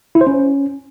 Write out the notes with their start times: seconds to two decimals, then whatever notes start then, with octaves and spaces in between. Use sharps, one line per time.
0.15 E4
0.21 C5
0.27 C#4